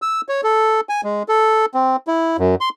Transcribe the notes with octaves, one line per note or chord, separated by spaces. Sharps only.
E6
C#5
A4
G#5
G#3
A4
C4
E4
F#2
C6